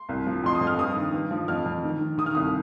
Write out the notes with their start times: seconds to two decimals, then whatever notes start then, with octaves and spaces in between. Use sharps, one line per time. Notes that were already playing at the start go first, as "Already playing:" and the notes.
Already playing: C6
0.09 C2
0.27 F3
0.44 F2 C6
0.55 D#6
0.61 F2
0.67 F6
0.79 G2 D#6
0.96 D#3
1.14 G2
1.31 F3
1.48 F2 F6
1.66 F2
1.84 D#3
2.01 D#3
2.18 D#3 D#6
2.26 F6
2.35 C2 D#6